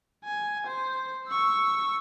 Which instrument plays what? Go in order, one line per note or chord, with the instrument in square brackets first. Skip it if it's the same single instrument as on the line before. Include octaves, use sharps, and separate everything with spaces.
[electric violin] G#5
C5
C#6 E6